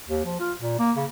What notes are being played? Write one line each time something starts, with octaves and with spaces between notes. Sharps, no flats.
D#2
F3
F4
A#2
A#3
C#3